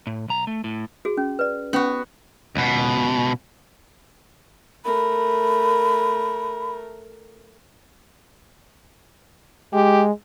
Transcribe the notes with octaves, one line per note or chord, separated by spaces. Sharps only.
A2
B1 A#5
A3
A2
F#4 G#4
C#4
B4 D5
B3 C#4 F#4
C#2 B2
A3 A#4 B5
G#3 G4